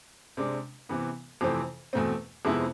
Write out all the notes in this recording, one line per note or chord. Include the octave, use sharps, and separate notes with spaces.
C3 G#3 D4
C3 E3 B3
F2 C3 E3 A3 C4
E2 B2 A3 C4
F2 C3 G#3 B3 E4